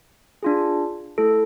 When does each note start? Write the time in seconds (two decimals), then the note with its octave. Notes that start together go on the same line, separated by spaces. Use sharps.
0.43 D4 F4 G#4
1.18 A3 E4 A4